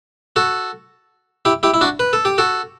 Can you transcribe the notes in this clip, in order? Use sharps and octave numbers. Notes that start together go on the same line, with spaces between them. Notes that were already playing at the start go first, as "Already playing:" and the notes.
F#4 A4
E4 G4
E4 G4
E4
D4 F#4
B4
A4
G4
F#4 A4